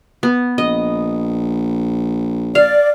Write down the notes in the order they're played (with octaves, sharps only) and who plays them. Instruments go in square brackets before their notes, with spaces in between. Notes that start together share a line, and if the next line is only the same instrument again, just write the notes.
[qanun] B3
[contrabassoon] A#1 [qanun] D#5
[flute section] D5 [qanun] F5